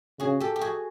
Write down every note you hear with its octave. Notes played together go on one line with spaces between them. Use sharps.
C#3 F#4 G#4
G4 A4
G4
F#4 G#4